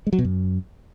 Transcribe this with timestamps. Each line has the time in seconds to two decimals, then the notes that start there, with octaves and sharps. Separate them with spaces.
0.07 G#3
0.13 F#3
0.19 B2
0.25 F#2